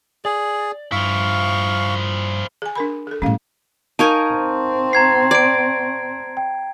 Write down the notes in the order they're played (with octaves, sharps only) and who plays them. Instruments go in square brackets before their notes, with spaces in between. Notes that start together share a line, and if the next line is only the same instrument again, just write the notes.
[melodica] G#4 [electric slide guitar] D5
[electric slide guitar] G2 [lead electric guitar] F3 E4 [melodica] F5 C#6
[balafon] G#4 G#5
D4 A#4 B5
G#4 A4
[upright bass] A2 G3 [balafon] C#4 F5
[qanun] D#4 A#4 G#5 [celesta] F5 C#6 G6 [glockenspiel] A5
[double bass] C4
[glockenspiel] A#5 G#6 C7
[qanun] D5 [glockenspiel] G#6 D7
[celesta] G5